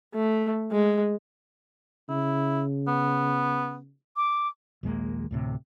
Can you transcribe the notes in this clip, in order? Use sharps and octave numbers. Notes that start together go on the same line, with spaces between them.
A3
G#3
C#3 E4
B3
D6
A#1 D#2 G#3 A#3
D2 A2 C3